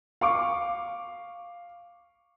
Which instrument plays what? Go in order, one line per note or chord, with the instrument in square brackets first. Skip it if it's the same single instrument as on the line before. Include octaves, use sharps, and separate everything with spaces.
[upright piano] F5 C#6 D6